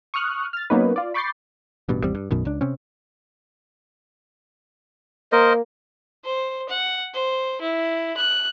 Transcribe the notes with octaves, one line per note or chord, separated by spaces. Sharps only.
C#6 D#6 F6 F#6
F6 A6
F#3 A#3 B3 C#4 D#4 B4
F4 D5
B5 C#6 D6 G6 A6 C7
A1 G2 B2
G#1 E2 G3 C4
G2
B1 F#2 B2 D#3
C#2 D4
C3 C4 C#4
A#3 A#4 C5 D#5
C5
F#5
C5
E4
F#6